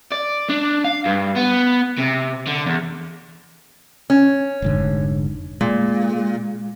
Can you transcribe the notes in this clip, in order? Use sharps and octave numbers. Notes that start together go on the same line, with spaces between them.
D5
D4
F5
G2
B3
C3
D3
E2
C#4
F1 G#2 D3
A#2 G#3